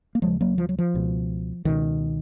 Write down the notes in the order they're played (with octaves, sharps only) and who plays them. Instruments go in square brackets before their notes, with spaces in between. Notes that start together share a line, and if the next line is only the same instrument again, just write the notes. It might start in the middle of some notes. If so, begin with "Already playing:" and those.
[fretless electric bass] A#3
D#2 C#3 F3 G#3
F#3 A#3
F3
F#3
F3
C#2 B2
C#2 B2 D#3